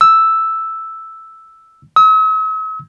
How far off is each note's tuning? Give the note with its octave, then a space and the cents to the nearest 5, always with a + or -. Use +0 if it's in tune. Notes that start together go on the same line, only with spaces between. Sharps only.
E6 +0
E6 -45